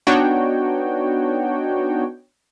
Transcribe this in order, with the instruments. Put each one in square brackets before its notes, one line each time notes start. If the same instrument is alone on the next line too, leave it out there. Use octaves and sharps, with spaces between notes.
[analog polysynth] B3 D4 D#4 F#4 C#5 G5